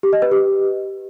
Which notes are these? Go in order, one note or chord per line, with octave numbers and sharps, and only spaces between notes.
G4
D#5
B4
G4